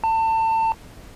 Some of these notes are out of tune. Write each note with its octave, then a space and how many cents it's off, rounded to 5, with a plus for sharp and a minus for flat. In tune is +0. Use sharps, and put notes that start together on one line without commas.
A5 +30